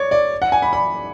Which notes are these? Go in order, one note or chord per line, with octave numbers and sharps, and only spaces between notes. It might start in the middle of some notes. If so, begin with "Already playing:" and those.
Already playing: C#5 D5
D5
F#5
G#5
B5
B5